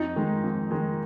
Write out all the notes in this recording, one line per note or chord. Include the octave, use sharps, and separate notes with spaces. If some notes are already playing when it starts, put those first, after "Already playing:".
Already playing: F2 D#4
D#3 G#3
F2
D#3 G#3